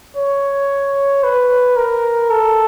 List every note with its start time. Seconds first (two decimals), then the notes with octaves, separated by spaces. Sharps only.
0.17 C#5
1.24 B4
1.77 A#4
2.30 A4